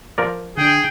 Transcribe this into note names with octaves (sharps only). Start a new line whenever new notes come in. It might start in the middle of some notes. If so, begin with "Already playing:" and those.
F3 A#4 D5
D3 D4 G#4 G5